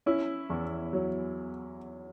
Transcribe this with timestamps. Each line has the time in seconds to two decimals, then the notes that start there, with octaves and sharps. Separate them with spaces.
0.06 C#4 E4
0.50 E2
0.93 F#3